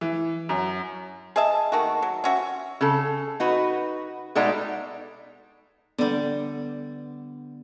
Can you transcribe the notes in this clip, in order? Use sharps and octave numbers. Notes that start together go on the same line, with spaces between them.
E3
F#2
G#4 D#5 E5 A5
D#3 A3 A#3 F#4
F#3
C#4 F#4 E5
C#3 A4
D#4 F#4 B4
B2 G#3 A3 D#4 D5 F#5
D3 G3 B3